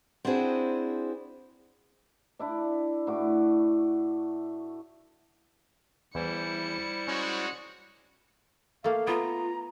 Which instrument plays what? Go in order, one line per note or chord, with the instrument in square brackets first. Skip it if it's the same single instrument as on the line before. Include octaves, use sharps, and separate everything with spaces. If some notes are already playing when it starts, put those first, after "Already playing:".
[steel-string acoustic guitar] C4 D4 E4 F#4 G#4 C5
[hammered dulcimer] D4 E4 D5
A2 E4 F#4 D6
[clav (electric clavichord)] E2 E3 [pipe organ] G3 E4 C5 [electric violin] C#7
[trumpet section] G#3 F#4 [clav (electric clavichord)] C#4
[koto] A3 A#3 [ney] F5
[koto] B3 [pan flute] F4 [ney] A#5